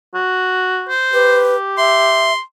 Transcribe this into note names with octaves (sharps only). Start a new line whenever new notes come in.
F#4
C5
G4 B4
E5 C6